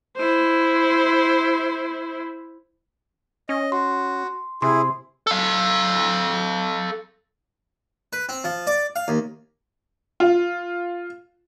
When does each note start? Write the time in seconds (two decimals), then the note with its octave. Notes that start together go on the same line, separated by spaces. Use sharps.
0.17 E4 C5
3.49 C#4 D#5
3.72 F#4 C6
4.62 C3 E4 G#4 C6
5.27 A4 F5
8.13 B4
8.29 C4
8.44 F3
8.67 D5
8.96 F5
9.08 D#2
10.20 F4